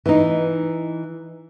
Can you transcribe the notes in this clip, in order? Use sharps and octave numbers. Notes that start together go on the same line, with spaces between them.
E3 D#4